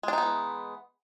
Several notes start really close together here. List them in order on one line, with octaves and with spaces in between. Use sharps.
G#3 D4 D#4 B3 E3